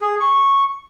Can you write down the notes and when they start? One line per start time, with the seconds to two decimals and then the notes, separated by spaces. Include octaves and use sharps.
0.01 G#4
0.20 C#6